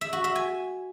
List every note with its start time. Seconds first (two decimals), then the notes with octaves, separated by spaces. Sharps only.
0.01 E5
0.13 F#4
0.24 E5
0.35 G#5